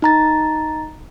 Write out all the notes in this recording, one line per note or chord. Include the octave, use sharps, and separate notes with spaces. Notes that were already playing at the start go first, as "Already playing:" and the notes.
D#4 A#5 A6